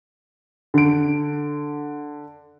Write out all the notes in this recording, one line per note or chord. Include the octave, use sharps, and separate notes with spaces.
D3 D7